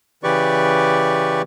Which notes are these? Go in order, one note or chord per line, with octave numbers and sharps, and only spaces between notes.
C#3 E3 G4 B4 D5 C#6